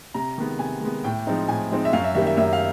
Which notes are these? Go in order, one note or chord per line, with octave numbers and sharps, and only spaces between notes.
C3 A#5
D#3 G#3 B3
C3 G#5
D#3 G#3 B3
A2 G5
F3 G#3 C4 D#4
A2 G#5
F3 G#3 C4 D#4
E5
F#2 F5
E5
D#3 G3 A#3 E5
E5
F#2 E5
F5